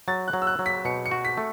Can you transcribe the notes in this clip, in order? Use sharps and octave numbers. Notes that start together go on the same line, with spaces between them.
F#3 A6
F#6
F#3
E6
F#6
F#3
B6
B2 C#7
C#7
F#4
B6
A3